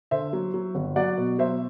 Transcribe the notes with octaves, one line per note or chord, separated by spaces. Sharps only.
D3 C5 E5
F#3
F#3
G1
F#3 D5 F#5
B2
F#3 C5 E5